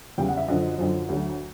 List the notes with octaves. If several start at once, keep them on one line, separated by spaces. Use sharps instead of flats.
E2 C#3 E3 G3 G5
F#5
E5
F#2 D3 F3 D#5
F#2 D3 F3
D2 D3 F#3